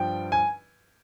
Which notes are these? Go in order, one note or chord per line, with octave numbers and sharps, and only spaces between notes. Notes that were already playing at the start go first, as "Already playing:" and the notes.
Already playing: G2 F3 G5
G#5